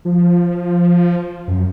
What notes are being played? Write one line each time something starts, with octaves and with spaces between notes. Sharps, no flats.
F3
F#2